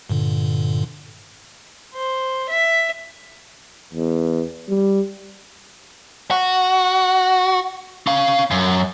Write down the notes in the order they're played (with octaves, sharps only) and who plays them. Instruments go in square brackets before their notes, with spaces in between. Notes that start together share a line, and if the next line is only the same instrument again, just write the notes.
[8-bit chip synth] G2 A#2 D3
[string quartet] C5
E5
[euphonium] E2
G3
[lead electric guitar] F#4
C#4 F5
F#2